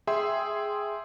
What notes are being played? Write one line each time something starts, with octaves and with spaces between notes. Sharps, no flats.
G#4 E5 G5 C6